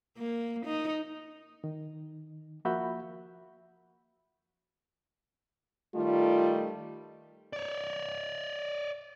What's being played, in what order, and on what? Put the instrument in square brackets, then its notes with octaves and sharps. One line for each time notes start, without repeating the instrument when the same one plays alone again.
[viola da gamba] A#3
D#4
[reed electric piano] D#3
F3 A#3 F#4 E5 B5 G6
[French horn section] D#3 G3 A3 [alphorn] F4
[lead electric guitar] C#5 D5